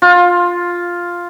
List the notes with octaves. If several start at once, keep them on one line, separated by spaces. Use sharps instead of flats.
F4